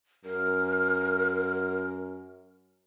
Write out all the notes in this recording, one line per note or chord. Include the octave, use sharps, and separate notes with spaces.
F#2 A#4